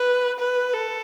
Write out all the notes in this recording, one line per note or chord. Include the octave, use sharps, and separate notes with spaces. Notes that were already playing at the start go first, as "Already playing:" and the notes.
Already playing: B4
B4
A4